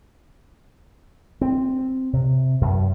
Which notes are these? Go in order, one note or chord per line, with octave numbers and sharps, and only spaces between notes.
C4
C3
F#2